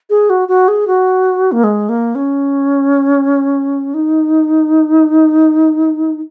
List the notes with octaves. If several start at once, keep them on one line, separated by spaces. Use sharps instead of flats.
G#4
F#4
F#4
G#4
F#4
A#3
G#3
A#3
C#4
D#4